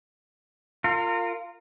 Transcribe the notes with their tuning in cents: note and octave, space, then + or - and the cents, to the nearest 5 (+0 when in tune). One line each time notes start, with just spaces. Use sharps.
F4 +0 A#4 -35